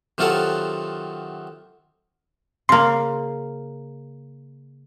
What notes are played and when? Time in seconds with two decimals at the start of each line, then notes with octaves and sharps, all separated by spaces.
0.18 C3 D#3 F#3 F4 A4 F#5
2.69 C#3 A#3 C6